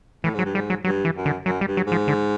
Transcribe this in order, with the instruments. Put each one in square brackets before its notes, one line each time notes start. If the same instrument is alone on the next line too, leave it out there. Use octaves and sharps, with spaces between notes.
[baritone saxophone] A2 [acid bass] E3
[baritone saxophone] G#2 [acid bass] F#3
[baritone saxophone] G2
[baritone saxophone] G#2 [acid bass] G3
[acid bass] F#3
[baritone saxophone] G2 [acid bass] F#3
[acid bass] E3
[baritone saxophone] F#2
[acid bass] D3
[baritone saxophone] F#2 [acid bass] F#3
[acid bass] G3
[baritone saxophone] G2
[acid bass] F#3
[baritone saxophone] G#2
[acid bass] F3
D3